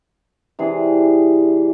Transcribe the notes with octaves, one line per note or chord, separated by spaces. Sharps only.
C3 E3 D4 G#4